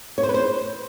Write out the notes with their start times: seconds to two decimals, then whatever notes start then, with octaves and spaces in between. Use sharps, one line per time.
0.18 C#5
0.23 C5
0.29 B4
0.34 C5